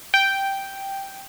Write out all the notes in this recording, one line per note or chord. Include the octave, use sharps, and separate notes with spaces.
G5